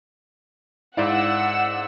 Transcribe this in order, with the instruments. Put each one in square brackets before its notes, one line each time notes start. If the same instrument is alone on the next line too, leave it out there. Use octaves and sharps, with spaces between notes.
[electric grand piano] G#2 D5 F5 [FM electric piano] E4 [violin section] F#5 E6